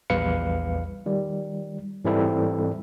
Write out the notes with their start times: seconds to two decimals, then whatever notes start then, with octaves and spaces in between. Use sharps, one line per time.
0.10 A#1 E2 G3 B4 F5 C#7
1.06 D#3 G3
2.05 G#2 E3 G3 C4 E4 A4